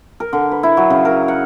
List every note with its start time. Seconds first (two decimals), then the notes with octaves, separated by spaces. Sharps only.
0.20 A#4
0.33 D3
0.51 B4
0.63 E4
0.77 F#3
0.90 C#3
1.05 A#4
1.28 F#5